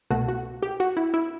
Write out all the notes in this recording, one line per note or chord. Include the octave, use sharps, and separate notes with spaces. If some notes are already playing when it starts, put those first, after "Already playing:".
C2 B2 A3 F#4
F#4
G4
F#4
E4
E4